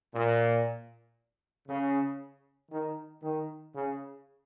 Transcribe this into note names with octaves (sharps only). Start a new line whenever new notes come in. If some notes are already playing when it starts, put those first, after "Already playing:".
A#2
C#3
D#3
D#3
C#3